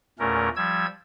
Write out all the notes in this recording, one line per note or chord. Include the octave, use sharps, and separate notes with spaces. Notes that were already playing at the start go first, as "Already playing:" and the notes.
E2 A#2 A3 C#4 A#4
F3 G3 E6 G#6